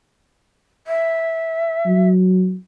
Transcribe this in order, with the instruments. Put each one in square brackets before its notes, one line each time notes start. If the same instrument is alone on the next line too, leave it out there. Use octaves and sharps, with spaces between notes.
[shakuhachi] E5
[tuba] F#3